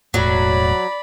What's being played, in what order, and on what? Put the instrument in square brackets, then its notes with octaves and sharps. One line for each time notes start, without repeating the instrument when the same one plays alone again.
[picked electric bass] E1 A2 [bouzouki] F#3 [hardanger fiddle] D5 B5